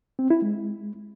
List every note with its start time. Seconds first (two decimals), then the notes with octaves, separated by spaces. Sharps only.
0.19 C4
0.30 E4
0.42 G#3